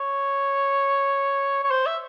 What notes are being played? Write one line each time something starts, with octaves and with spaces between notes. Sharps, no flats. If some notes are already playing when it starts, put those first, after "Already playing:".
Already playing: C#5
C#5
C5
E5